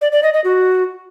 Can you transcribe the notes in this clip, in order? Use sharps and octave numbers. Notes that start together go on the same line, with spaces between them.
D5
D5
D#5
D#5
F#4